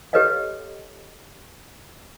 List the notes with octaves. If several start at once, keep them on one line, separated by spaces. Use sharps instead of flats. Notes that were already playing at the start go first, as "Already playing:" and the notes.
G4 A4 B4 C#5 D#5 F5